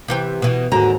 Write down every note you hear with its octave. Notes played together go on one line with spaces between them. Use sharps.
C3 E3 G4
B2 E3
D#2 G#2 D3 F#4 A#5